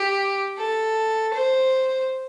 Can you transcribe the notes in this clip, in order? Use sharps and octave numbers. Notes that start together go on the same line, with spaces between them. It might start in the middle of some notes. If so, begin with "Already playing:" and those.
Already playing: G4
A4
C5